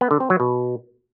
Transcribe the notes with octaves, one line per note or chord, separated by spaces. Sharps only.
B3
D3
C4
F#3
B2